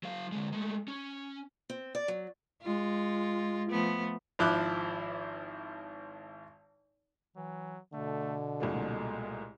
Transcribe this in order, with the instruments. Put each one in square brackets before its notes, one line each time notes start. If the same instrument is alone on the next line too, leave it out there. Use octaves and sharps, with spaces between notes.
[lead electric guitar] F#3 F5
D3 G#3
G#3 A3
C#4
[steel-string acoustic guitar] C4
D5
F#3
[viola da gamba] G#3 F4
F3 A3 B3
[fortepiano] G#1 F3 E4 D6 F#6
[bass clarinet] E3 [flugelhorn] F#3
[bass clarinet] B2 [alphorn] D3 [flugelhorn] A3
[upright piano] C2 A#2 A3 [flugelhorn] G#3